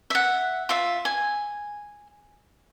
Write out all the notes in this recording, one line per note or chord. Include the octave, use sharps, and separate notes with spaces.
E5 F#5
F4 E5
G#5